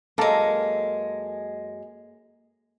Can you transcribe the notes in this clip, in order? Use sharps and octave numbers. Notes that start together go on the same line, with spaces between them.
F#2 G#3 A#3 A4 A#4